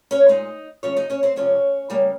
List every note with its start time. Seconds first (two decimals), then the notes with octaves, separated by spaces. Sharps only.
0.11 C#4 C#5
0.28 A#2 G#3 D#4 D#5
0.83 C3 F3 G#3 C#4 C#5
0.96 D#4 D#5
1.10 C#4 C#5
1.23 C4 C5
1.36 C3 F3 G#3 C#4 C#5
1.90 C#3 G3 A#3